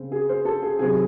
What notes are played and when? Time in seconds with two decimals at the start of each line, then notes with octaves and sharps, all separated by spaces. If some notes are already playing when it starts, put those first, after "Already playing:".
Already playing: C#3 C4
0.12 G#4
0.29 C5
0.45 A4
0.63 G#4
0.79 C3 D#3 F#3 C4 G#4